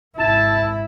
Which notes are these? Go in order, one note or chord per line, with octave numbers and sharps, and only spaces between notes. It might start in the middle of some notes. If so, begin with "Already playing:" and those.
G#1 E4 A5